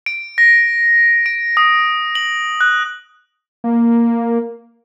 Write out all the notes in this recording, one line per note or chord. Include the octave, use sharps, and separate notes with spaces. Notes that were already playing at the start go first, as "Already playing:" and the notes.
D7
A#6
D7
D#6
F#7
F#6
A#3